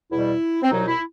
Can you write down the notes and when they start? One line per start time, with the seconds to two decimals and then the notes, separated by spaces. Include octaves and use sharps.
0.11 E2 B2 G3 E4
0.63 C4
0.71 C2 B2 F#3 D#4
0.88 E4